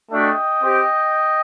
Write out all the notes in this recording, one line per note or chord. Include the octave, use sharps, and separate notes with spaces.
A3 D4 F#4 D#5 G5
C4 G4